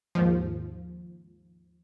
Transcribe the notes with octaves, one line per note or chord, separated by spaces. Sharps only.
D#2 G#2 F3